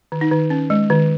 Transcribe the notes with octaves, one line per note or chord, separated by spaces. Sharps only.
D#3
D#4
D#3
C#4
G#3
D#3